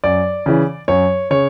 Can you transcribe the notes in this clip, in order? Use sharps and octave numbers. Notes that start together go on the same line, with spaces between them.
F#2 D5
C#3 E3
F#2 C#5
C#3 C#5